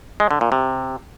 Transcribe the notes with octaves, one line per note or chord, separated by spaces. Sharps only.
G#3
D3
A#2
C3